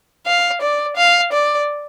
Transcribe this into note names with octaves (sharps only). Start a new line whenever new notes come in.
F5
D5
F5
D5